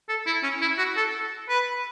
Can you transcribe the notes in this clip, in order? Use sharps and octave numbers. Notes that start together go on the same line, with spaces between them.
A4
E4
C#4
E4
F#4
A4
B4